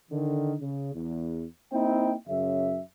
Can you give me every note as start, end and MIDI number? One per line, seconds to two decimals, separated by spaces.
0.11 0.54 50
0.11 0.54 51
0.61 0.93 49
0.94 1.45 40
1.72 2.14 58
1.72 2.14 60
1.72 2.14 63
1.72 2.14 64
1.72 2.14 79
2.28 2.79 42
2.28 2.79 49
2.28 2.79 76